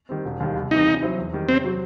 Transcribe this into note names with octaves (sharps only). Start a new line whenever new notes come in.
D#3 G3 C4
E1
D#2 D#3 G3
C2
C3 E3 D#4
C3
F#3 C4 E4
E2
D#3 G3
C3 C4
F#3 C4 F#4